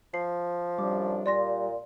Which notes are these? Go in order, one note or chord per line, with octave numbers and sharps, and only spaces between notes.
F3 C7
C2 F#2 G3 D4 D6
A#2 D5 C6 A#6